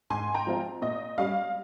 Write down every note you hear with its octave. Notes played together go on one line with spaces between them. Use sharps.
G#2 G#5 C6
G5 A#5
F3 G#3 C4 F4
A#2 D#5
G3 C#4 F5